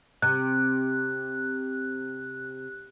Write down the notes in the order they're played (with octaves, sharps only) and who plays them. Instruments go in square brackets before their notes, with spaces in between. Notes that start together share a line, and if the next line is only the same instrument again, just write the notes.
[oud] C3 [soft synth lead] F#6